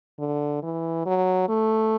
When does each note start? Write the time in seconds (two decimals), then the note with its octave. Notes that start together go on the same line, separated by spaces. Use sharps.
0.19 D3
0.63 E3
1.06 F#3
1.48 A3